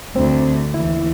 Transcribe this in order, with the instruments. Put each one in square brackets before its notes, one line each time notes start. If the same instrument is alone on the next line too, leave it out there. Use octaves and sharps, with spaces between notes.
[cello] D2 [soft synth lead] C4
[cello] D#2 E3 [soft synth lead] E4